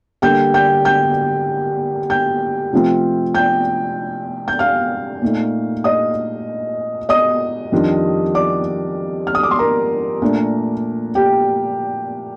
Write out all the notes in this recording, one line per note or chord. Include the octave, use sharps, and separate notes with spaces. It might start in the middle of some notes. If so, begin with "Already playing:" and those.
D3 G3 A#3 G5 G6
G5 G6
G5 G6
G5 G6
C3 F3 A3 C4 F4
G5 G6
G6
F5 F6
A#2 A3 D#4
D#5 D#6
D#5 D#6
F2 D#3 G3 D4 F4
D5 D6
F6
D#6
D6
C6
A#4 A#5
A#2 A3 D4
G4 G5